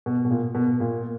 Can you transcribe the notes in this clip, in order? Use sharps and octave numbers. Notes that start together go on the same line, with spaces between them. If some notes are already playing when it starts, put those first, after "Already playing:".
B2
B2
A#2
B2
A#2